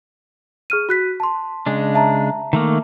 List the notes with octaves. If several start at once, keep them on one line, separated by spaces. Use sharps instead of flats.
G#4 F6 D#7
F#4 F#6 B6
A5 C6
C#3 G#3 D4
E5 A5 A#5
D#3 A3 A#3